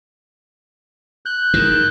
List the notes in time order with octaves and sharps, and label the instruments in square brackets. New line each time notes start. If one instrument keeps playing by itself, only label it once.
[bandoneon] F#6 G6
[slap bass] G#2 D#3